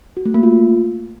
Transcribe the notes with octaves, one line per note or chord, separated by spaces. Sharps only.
F#4
A3
A#3
F4